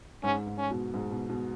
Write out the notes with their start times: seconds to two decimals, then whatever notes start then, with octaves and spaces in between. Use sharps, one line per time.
0.24 G#2 C#4
0.47 G#2
0.58 C#4
0.71 B2
0.94 G#2
1.11 B2
1.29 B2